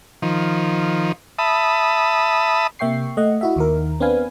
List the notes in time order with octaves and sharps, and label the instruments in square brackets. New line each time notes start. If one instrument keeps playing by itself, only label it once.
[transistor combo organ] D#3 F3
E5 A5 B5 D#6
[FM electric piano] C3 A#3 E5 G5 C#6 C7
A3 D#5 F#5
E4 F#4 E5
D#2 D#3 A#4
B3 C4 D4 B4 F5 G#5